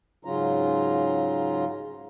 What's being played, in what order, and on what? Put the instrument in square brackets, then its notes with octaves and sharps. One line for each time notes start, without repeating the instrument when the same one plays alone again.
[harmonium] G#2 C#3 F#3 C#4 F4 A#5